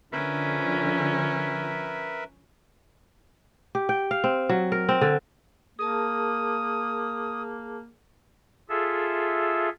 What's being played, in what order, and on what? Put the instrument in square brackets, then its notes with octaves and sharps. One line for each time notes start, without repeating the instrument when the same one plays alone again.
[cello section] D3 F3 [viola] C#4 [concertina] A#4 B4 E5
[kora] G4
G5
F5
C4
F#3
A#4
C4
D3
[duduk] A#3 [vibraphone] G#4 A#4 A5 [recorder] D#6
[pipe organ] F4 G#4 A4 E5